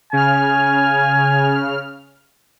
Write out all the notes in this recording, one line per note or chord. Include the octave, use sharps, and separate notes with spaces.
C#3 G#5 F6